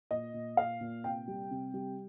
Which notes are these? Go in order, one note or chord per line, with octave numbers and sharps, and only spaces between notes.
A#2 D#5
A#2
A#2 F5
A#2
C3 G5
G3
C3
G3